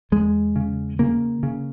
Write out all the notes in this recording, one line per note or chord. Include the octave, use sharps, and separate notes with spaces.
E2 G#3
C#3
C#3 A#3
C#3